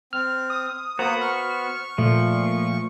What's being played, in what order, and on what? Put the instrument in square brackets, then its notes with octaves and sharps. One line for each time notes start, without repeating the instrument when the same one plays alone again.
[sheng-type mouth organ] C4 [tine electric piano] F6
[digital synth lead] D#6
[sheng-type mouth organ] A#3 D#6 [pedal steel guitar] B3 F#4 [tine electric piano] C5 [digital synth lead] A#5
[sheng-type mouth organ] C#6 [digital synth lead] F6
[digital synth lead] A#2 [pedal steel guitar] F3 [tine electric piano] A3